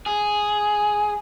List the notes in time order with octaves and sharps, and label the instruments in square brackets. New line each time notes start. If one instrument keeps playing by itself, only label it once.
[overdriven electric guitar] G#4